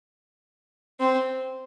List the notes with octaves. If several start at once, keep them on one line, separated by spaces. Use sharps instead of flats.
C4